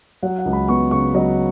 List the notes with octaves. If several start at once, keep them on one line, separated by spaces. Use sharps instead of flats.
F#3 F#5
F#5
C#2
B5
B3 C#6
C#3 C#6
F#3 D#5